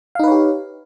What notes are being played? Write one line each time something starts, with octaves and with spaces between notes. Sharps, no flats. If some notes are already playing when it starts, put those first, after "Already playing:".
D#4 G4 B4 C#5 F5